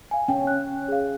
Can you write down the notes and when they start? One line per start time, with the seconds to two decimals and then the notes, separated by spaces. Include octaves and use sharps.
0.11 F5 G#5
0.28 C#4 G5
0.47 F#6
0.88 G#4 F5